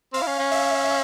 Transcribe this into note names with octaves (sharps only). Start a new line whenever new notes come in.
C4 F5
E4
C#4
C#4
E5